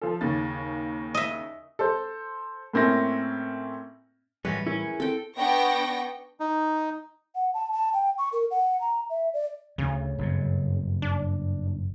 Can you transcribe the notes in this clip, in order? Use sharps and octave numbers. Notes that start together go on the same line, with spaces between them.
F3 A4
D#2 C#3 A6
D#5 E5
A4 C5
A2 A#3 C4 C#4 E4 A#6
F#2 A2 E3 G3 G#3 C#4 B4
C#4 E4 G#4 A#4
C4 A4 G5
B3 D4 G5 C#6 A#6
D#4
F#5
A5
A5
G5
C#6
A#4
F#5
A#5
E5
D5
D2 C#3
F#1 G2 B2
D4